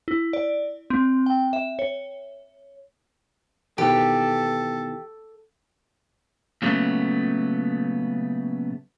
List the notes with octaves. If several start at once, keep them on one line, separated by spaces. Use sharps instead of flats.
E4
D5
C4
G5
E5
C#5
B2 D#3 E3 G4 A4
A#2 C#3 F#3 A3 B3